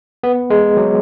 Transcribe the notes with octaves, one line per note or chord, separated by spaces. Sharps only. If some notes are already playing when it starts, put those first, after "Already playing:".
B3
G#3
F#3